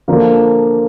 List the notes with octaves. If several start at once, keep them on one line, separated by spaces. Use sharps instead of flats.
D3 F3 A#3 D4 F4